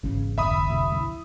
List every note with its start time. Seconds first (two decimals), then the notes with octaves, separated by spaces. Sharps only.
0.03 G#1 E2 C#3
0.38 F1 D2 E5 B5 D#6
0.70 C3
0.92 F3 E4